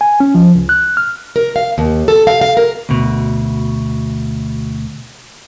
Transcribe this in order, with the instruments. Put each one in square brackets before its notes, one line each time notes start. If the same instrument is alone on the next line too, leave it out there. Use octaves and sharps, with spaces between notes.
[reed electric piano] G#5
C#4
F3
C#2
F#6
F6
[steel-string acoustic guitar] A#4
F5
D#2
A4
F5
F5
A#4
[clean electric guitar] D2 B2